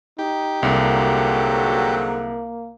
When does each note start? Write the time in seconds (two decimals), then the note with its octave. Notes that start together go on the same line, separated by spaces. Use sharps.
0.19 D#4 G4
0.63 C2 G#2 D3 F#3 A#3